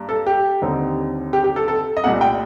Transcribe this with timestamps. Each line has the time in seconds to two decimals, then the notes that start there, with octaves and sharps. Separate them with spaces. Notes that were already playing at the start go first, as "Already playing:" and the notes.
Already playing: G2 A#3
0.09 A4
0.26 G4
0.62 D#2 D3 G3 C4 D#4
1.33 G4
1.44 G4
1.56 A4
1.68 A4
1.97 D#5
2.04 C2 A#2 A3 F#5
2.21 G5